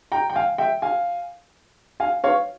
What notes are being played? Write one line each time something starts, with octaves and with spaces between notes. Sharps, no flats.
G5 A#5
G5
F5 G#5
E5 G5
F5 G#5
F5 G#5
C#5 F5